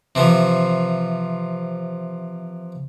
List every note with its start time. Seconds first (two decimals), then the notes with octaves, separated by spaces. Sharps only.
0.15 C3 E3 F3